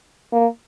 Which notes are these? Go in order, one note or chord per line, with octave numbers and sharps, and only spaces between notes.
A#3